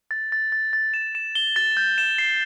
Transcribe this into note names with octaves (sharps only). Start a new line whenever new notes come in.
A6
A6
A6
A6
E7
E7
G7
A6
G6
E7
C7